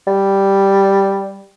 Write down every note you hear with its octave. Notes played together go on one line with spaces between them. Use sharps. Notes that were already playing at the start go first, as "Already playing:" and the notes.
G3